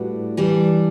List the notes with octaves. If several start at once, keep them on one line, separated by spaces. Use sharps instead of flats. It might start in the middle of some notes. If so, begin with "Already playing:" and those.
Already playing: A2 G3 D4 F#4 B4
E3 G3 D4